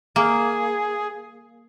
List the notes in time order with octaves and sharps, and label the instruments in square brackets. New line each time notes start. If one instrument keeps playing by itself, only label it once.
[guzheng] A#3 [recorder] G#4